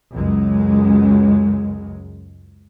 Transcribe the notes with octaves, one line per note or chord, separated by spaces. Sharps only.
C#2 F#2 G#3